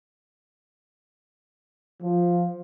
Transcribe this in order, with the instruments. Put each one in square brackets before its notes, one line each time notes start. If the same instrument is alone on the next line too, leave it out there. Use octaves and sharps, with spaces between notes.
[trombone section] F3